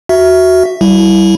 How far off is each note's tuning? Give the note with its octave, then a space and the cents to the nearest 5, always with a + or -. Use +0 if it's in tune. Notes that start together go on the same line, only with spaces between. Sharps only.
F#4 +0 E5 +0
G3 -30 E4 +0